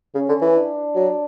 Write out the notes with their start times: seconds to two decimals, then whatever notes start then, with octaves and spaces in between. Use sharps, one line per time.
0.15 C#3 C#4
0.29 D3
0.42 E3
0.56 D4
0.96 F#3